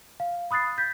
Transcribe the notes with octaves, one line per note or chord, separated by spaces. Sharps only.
F5
B5 D#6 F#6 A6 C7
G6 B6